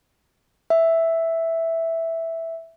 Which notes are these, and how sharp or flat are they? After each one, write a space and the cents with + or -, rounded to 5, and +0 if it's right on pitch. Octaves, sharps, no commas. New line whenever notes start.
E5 -5